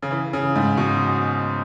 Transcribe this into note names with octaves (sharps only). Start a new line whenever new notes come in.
C#3
E3
C#3
G#2
B2